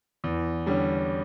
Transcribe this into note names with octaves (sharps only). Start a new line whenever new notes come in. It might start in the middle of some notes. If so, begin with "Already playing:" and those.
E2
D3 G3 C#4